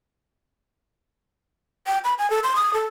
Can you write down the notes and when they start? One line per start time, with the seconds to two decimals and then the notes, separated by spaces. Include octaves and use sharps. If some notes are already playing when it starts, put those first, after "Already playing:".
1.87 G5
2.04 B5
2.19 G#5
2.30 A4
2.44 C6
2.56 D#6
2.74 A4